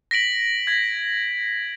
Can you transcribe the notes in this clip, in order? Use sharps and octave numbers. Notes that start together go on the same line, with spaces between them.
A#6 B6 D7 F#7
G#6 B6